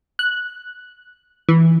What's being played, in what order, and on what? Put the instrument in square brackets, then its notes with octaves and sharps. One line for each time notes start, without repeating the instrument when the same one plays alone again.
[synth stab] F#6
E3